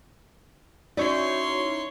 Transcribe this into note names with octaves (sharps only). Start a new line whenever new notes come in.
C#4 D#4 E4 F#4 C#5 D5 C6